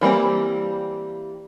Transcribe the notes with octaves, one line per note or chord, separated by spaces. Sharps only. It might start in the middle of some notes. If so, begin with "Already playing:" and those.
E3 G3 A#3 C4